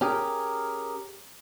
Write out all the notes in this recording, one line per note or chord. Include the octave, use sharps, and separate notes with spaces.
C#4 G4 G#4 A#4